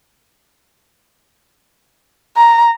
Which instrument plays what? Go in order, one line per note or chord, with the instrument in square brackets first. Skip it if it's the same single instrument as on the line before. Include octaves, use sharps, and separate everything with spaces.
[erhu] A#5